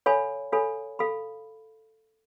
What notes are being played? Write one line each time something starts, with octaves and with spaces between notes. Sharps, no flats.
A4 C#5 F5 G#5 B5
A4 C#5 F5 G#5 B5
A4 F5 B5